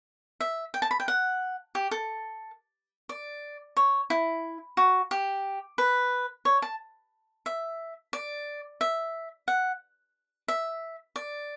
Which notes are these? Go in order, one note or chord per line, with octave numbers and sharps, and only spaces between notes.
E5
G5
A5
B5
G5
F#5
G4
A4
D5
C#5
E4
F#4
G4
B4
C#5
A5
E5
D5
E5
F#5
E5
D5